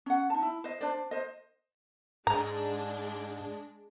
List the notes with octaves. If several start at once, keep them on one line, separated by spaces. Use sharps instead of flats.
C#4 F#5
D#4 A5
E4
C5 D#5
D4 C5 D5
C5 D#5
G#2 G#3 D4 A#5